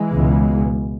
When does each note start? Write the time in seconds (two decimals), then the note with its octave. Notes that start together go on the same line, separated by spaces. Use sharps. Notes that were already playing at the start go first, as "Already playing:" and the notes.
Already playing: E3 G#3
0.12 C#2 B2